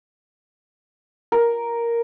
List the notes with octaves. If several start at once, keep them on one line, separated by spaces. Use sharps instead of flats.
A#4